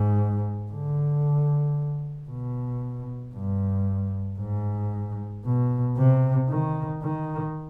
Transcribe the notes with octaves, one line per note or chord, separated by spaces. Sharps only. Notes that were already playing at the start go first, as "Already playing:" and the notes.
Already playing: G#2
D3
B2
G2
G#2
B2
C3
D#3
D#3